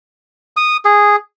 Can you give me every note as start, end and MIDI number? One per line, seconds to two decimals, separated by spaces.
0.57 0.77 87
0.85 1.16 68